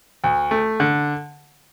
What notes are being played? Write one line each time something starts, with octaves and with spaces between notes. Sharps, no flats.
D2
A3
D3